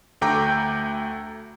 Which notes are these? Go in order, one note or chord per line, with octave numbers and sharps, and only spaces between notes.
D2 A3 G5 A#5 D6 G6